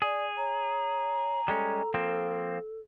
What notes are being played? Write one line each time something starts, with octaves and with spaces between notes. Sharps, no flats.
G#4 D5
C#5 A#5
G3 G#3 C#4 A4
F3 A#3 C4